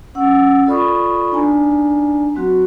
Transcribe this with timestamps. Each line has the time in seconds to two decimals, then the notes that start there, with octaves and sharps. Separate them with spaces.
0.15 C#4 F#5 E6
0.66 F4 A4 D5 B5 C#6 D#6
1.32 D4 D#4 D5 G#5 A#5
2.35 F#3 C4 F#4